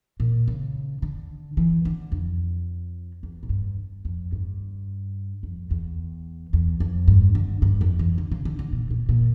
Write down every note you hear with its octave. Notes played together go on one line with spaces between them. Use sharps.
A#2
C#3
D3
E3
D3
F2
E2
A2
G2
F2
G2
F2
E2
E2
F2
G2
D3
G2
F2
E3
D3
C#3
D3
D3
A#2
A#2
A#2